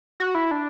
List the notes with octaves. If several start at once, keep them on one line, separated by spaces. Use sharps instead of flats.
F#4
E4
D4